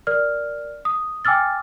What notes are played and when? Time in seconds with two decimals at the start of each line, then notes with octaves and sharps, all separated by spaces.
0.07 A#4 D5 F6
0.85 D#6
1.25 G5 G#5 D6 E6 F6 A6